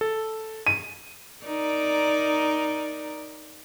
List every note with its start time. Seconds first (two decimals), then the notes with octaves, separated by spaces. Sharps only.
0.01 A4
0.67 D#7
1.45 D#4 A#4 D5